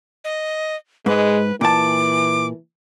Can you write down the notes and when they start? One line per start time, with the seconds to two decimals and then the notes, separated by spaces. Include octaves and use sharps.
0.24 D#5
1.06 G#2 G#3 B4
1.61 A#2 E3 A5 D6